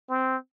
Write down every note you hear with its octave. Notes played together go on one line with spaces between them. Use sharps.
C4